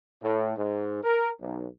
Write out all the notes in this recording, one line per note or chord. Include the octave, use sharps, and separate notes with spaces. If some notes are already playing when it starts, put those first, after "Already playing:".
A2
G#2
A#4
B1